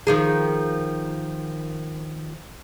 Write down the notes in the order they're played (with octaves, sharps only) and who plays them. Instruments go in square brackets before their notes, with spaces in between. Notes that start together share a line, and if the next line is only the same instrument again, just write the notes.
[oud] D#3 F3 G#4